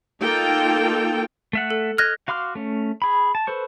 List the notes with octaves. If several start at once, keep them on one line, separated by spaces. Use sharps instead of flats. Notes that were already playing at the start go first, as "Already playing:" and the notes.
A#3 D#4 F4 A4 G5
A3 E5 F#5
A4
D#5 F6 F#6 G#6 A#6
F#4 F5 C6 D6 F6
A3 C#4
G#4 B5
A5
A4 B4 C5 C#6